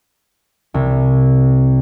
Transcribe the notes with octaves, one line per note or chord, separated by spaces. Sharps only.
C2